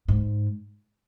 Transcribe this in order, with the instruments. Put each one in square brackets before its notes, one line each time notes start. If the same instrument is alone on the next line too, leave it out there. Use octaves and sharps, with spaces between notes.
[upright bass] G#2